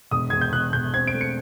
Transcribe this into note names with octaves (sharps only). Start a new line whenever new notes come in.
E1 D#6
E1 G#6
G6
E1 F#6
E1 G6
C4 G#6
D7
A3
C#7